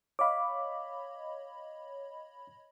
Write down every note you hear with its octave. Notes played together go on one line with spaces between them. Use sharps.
C#5 D#5 F5 B5 D6